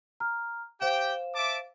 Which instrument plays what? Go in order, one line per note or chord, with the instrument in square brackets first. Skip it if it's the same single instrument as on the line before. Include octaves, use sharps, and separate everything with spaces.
[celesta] A#5 F6
[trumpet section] G4 G5 [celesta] C5 F5 E7
[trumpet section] E5 A5 D6